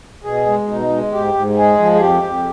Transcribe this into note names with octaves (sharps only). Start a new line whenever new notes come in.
B2 G#4
G#3
B2 D#4
G#3
G#2 G4
G#2
G#3 G#4
F3
G#4
F2 G4
F2